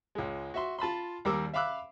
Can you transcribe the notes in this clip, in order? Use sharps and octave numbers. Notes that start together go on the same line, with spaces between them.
C#2 G#3
F#4 E5 C6
F4 A5 B5 C6
D#2 G3 A#4 D6 E6
E5 F5 B5 D6 E6 F#6